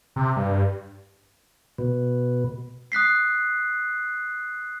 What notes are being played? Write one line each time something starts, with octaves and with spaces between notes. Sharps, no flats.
C3
G2
B2
D#6 F#6 B6 C7